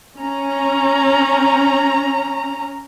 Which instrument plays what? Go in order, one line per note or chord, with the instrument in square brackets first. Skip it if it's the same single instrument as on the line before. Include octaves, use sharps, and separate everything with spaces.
[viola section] C#4 A#5